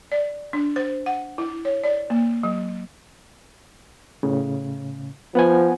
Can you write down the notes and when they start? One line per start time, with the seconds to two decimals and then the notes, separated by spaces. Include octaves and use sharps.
0.12 D5
0.53 D4
0.76 C5
1.06 F#5
1.38 E4
1.65 C#5
1.83 D5
2.10 A#3
2.43 F#3
4.23 A2 C#3
5.35 F3 B3 F#5 G#5